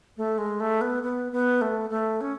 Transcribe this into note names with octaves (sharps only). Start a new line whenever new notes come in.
A3
G#3
A3
B3
B3
B3
A3
A3
C#4